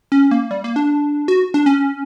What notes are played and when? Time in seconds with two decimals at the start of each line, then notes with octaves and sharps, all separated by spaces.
0.12 C#4
0.31 A#3
0.51 G3
0.64 A#3
0.76 D4
1.28 F#4
1.54 D4
1.66 C#4